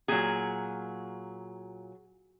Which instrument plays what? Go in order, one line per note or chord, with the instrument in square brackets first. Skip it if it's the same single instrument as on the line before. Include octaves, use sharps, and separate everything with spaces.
[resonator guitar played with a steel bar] A#2 F#3 G#4